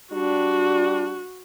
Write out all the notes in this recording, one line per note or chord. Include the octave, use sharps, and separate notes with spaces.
G3 D4 F#4